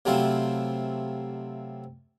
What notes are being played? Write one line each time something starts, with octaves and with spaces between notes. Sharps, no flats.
C3 F#3 A3 C4 E4 F4